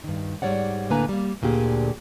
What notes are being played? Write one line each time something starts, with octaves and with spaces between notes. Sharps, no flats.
G2 D#3
G#2 C3 G3 C#5 D5 F#5
A2 D3 A#3 B4 G#5 A#5
G3 A#3
D2 A#2 D3 G4 G#4